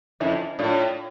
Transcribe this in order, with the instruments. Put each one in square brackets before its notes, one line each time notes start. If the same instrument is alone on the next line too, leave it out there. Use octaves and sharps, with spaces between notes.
[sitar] F2 [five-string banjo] C#4 E4
[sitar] A2 [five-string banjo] D4 F4